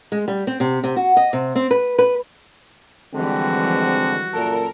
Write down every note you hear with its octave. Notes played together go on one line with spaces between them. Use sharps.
G#3
G3
C4
C3
C3
F#4
D#5
C3
C4
B4
B4
D3 E3 F3 G3 G#3 C4 F#4
F#2 A#2 A4 A#4